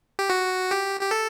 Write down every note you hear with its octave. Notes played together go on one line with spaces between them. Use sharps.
G4
F#4
G4
G4
A4